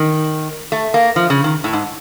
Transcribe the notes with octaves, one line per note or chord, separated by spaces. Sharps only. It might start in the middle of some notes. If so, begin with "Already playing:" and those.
Already playing: D#3
A3
A#3
F3
C#3
D#3
A2
G#2